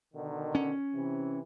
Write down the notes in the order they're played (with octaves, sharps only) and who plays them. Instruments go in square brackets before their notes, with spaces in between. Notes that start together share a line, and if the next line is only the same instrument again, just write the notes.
[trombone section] B2 D3 D#3
[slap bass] C#4
[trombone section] C3 E3